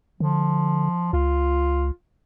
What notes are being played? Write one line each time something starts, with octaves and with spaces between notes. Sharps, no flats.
D3 F3
C#2 F4